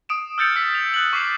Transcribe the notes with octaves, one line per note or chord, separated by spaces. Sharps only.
D#6 D7 E7
E6 F6 G6 A6 C#7 F7
E6 B6
F7
F#6 F#7
C#6 D6 B6 C7 E7